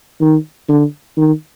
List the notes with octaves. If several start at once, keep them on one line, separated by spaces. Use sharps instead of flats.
D#3
D3
D#3